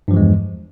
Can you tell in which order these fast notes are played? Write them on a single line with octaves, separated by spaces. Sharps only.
G2 F3 E3 G#3 E2